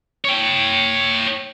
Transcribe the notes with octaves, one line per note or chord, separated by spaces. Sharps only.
C#5 G5